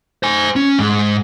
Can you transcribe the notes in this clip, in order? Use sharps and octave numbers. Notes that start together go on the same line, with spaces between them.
C5 G#5
C#4
G#2